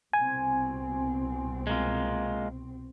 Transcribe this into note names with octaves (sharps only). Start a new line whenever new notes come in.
C2 B2 C4 G#5
G#3 A#3 F4